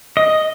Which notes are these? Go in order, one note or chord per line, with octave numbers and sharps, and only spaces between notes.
D#5